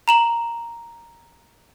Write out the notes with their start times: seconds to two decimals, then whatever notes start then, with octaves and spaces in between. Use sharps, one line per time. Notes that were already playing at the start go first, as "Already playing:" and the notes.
0.08 A#5 E7 F#7